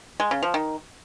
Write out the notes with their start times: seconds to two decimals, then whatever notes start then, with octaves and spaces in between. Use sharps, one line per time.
0.20 G#3
0.31 C#3
0.43 F3
0.54 D#3